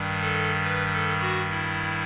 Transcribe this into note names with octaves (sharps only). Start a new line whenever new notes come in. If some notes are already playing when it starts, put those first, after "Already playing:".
Already playing: G2 D#3 G3
A4
B4
A4
F#4
E4